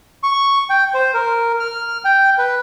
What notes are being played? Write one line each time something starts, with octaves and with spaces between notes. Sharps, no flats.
C#6
G5
C5
A#4
F6
G5
B4